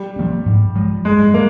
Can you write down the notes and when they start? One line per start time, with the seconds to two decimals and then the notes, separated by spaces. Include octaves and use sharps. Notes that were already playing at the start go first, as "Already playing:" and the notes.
Already playing: G3
0.16 F3 A#3 C#4
0.46 G#2
0.75 F3 G#3
1.05 G2 G#3
1.34 G3 A#3